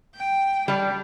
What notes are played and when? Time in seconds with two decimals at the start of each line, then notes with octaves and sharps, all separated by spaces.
0.16 G5
0.68 G3 D4 D5